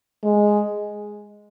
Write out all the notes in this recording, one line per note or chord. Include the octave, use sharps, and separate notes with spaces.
G#3